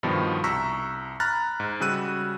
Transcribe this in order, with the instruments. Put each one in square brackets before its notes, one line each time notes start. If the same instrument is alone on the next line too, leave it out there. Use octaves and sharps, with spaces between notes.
[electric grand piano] G2 B2 D#3 F3 G3 B3
C2 A#5 C#6 E6 B6
A#5 B5 F6 F#6 A6
G#2
C#3 G3 F#4 E6 F#6 D#7